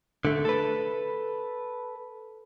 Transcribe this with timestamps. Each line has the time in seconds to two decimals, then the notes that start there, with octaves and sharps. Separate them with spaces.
0.25 D3 A3
0.45 A4 B4